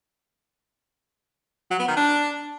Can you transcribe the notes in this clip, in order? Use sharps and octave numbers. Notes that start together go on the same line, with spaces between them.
F#3
B3
D#3
D4